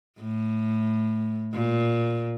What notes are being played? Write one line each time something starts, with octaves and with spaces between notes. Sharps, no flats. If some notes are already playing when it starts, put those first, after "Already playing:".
A2
A#2